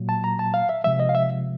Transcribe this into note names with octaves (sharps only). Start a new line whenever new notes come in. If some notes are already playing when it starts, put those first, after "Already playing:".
Already playing: A#2 F#3 A#3
A5
A#5
A5
F5
E5
C3 F3 G#3 E5
D#5
F5
E5